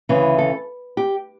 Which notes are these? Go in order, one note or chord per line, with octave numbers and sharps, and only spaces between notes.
D2 C#3 E3
A4
G4